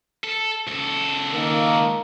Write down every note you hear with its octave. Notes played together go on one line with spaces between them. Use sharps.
A4
C#2 A4
D#3 A#3